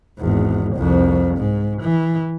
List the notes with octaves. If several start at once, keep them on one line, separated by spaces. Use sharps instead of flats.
G#1 E2
C2 F2
G#2
E3